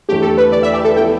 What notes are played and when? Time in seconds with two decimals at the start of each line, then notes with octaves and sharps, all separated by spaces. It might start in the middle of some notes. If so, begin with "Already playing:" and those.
0.09 E2 D3 A3 E4 G4
0.22 A4
0.37 B4
0.52 D5
0.63 E5
0.74 G4
0.84 A4
0.96 F3 B3 E4 A4 G5